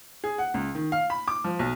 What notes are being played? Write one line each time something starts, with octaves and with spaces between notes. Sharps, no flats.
G#4
F#5
C#2
D#3
F5
B5
D6
F3
B1